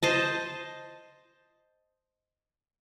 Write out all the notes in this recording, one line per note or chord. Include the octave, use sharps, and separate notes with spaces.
C5 D#5 A5